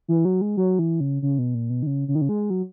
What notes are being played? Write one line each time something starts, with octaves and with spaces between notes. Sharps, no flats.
E3
F#3
G#3
F#3
E3
C#3
C#3
B2
A#2
B2
D#3
C#3
C#3
D#3
C#3
G#3
F#3